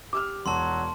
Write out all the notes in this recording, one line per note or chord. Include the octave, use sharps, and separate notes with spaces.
G4 D6 E6 F6
E1 F#3 A5 C6